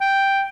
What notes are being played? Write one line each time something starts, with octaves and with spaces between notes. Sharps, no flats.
G5